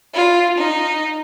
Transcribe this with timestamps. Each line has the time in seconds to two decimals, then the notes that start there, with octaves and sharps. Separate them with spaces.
0.14 F4
0.58 D#4